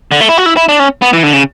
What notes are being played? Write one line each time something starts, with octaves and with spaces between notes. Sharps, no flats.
D3
A3
E4
F#4
E4
E4
D4
C#4
B3
E3
D3
C#3